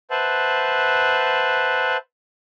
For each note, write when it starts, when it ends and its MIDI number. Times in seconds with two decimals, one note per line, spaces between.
0.10 1.97 71
0.10 1.97 72
0.10 1.97 76
0.10 1.97 78
0.10 1.97 81